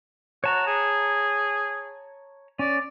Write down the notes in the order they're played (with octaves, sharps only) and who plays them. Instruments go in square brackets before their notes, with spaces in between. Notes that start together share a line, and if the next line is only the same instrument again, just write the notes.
[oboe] F#4 [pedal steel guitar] C#5 A5 A#5
[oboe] G#4
[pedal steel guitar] C#4 [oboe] D5